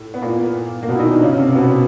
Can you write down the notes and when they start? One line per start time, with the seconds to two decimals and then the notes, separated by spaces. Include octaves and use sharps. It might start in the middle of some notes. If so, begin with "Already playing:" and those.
Already playing: A2
0.14 B3
0.22 A#2 A#3
0.83 A#3
0.88 B2 B3
0.95 E4
0.99 D#3 D#4
1.11 D4
1.22 C#3 C#4
1.38 C3 C4
1.55 B2 B3